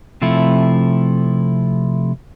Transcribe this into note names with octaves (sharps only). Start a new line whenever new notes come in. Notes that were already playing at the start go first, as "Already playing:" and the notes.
C3 F3 A3 E4